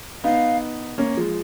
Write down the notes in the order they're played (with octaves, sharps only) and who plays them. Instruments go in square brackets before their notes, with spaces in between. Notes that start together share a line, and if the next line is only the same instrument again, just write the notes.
[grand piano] B3 D#4 [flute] F5
[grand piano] A#3 C#4
F3 G#3